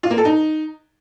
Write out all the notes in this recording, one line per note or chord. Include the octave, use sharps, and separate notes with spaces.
F4
A#3
A4
D#4